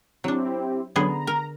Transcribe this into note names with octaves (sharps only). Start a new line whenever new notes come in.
F#3 C4 D4 E4 G4
D3 F#3 B3 C#4 G#4 C#5
A#5
A#4